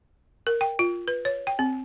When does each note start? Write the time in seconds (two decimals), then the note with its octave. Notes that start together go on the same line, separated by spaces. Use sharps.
0.47 A#4
0.61 G5
0.79 F4
1.08 B4
1.25 C#5
1.47 G5
1.59 C4